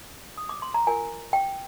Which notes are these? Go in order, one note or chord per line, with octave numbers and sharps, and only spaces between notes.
D#6
D6
C6
A#5
F4 A#4 G#5
G5